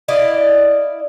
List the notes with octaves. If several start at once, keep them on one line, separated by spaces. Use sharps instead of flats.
E4 D5 D#5 F5